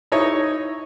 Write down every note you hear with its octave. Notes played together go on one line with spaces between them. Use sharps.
D#4 E4 C#5 D#5